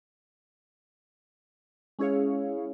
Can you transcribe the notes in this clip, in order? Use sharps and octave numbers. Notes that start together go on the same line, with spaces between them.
G#3 C#4 E4 G#4 C#5 F5